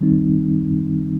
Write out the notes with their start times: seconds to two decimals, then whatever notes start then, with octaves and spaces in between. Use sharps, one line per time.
0.01 D#3 G3 C4 D#4